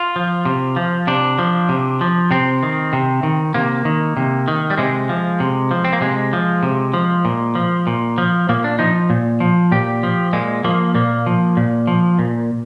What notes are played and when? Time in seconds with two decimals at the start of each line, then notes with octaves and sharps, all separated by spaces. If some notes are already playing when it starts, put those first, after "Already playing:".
Already playing: F4
0.16 F3
0.45 C3
0.76 F3
1.07 C3 D4
1.39 F3
1.69 C3
2.01 F3
2.31 C3 C4
2.63 D#3
2.93 C3
3.23 D#3
3.54 C3 A#3
3.85 D#3
4.17 C3
4.48 D#3
4.70 G3
4.78 C3 G#3
5.09 F3
5.40 C3
5.71 F3
5.84 C4
5.93 A#3
6.01 C3 G#3
6.33 F3
6.63 C3
6.94 F3
7.25 A#2
7.55 F3
7.87 A#2
8.18 F3
8.49 A#2 A#3
8.64 D4
8.79 F3 D#4
9.10 A#2
9.40 F3
9.71 A#2 G4
10.03 F3
10.33 A#2 G#3
10.64 F3 A#3
10.95 A#2 A#3
11.26 F3
11.57 A#2
11.87 F3
12.19 A#2